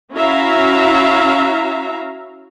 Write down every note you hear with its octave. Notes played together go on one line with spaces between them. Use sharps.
C#4 E4 F#4 E5 F5 A#5